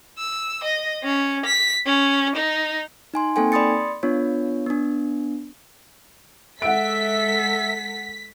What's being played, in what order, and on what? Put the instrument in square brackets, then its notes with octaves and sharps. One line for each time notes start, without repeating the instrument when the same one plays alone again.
[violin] E6
D#5
C#4
B6
C#4
D#4
[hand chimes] D#4 G#5 C6
A#3 C4 D#4 A4 G5 G#5
D5 B5 C6 D#6 A6 C#7
B3 D4 F4 C#5
B3 D4
[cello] G#3 A4 [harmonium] E5 [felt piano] F#5 D7 [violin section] B6